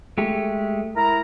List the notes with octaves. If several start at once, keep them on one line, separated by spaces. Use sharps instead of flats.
G#3 A3 G4
E4 A#4 A#5